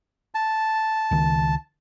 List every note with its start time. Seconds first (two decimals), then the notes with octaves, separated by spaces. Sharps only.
0.35 A5
1.11 C#2 D#3